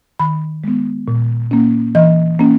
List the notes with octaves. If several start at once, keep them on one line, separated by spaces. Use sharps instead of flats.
D#3 B5
G#3 B3
A#2
A#3 C#4
E3 D#5
A#3 C#4